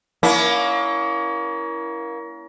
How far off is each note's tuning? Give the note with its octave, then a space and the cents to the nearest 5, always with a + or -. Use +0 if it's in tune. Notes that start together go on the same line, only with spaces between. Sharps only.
A#3 +25 C#4 +35 E4 +0